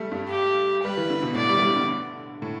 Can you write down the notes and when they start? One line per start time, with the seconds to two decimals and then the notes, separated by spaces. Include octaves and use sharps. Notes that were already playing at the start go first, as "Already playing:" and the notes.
Already playing: G3 A3
0.12 G2
0.29 G4
0.83 G3 B4
0.97 E3
1.10 D3
1.23 B2
1.35 A2 D5
1.49 G3
1.56 E3
1.62 G3
1.75 D3
2.42 A2